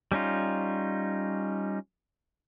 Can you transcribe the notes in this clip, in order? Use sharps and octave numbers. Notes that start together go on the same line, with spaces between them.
G3 C#4 D#4 F4